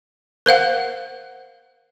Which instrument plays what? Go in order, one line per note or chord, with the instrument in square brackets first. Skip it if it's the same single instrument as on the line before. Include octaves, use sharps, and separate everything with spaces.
[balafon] A#4 C5 F5 F#5